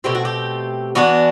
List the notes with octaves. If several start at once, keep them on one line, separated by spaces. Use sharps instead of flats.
B2 A3 C4 G4
F#4
G4
E3 B3 D4 F#4